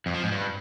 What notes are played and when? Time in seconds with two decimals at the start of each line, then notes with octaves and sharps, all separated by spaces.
0.06 F2
0.15 F3
0.23 G#2
0.32 G2